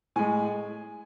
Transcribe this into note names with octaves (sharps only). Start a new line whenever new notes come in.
A2 G#3 G#5